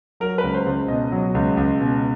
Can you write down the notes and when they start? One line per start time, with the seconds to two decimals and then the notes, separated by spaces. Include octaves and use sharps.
0.20 F#3 A#4
0.38 B4
0.43 C#2
0.55 C5
0.66 C#2
0.88 B2 D#5
1.12 F#3
1.35 C#2
1.57 C#2
1.80 B2